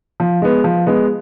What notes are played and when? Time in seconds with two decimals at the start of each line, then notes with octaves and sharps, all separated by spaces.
0.20 F3
0.42 G#3 B3
0.64 F3
0.86 G#3 B3